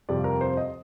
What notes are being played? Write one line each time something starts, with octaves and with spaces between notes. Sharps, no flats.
F2 C3 G3 D5
A#4
C5
D#5